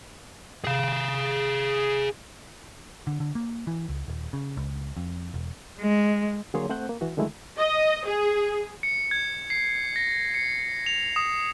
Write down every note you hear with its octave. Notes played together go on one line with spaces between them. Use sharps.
G#4 F5
D3
D3
A#3
E3
C#2
D#1
C#3
C#2
F2
E1
G#3
D3 F#3 A#3 G#4 C#5 C6
A3 C4 C5 F#5 F#6 G6
A#3
E3 F#4
D3 D#3 F#3 G#3 A3 E4
D#5
G#4
C#7
G#6
C7
A#6
C#7
F7
D#6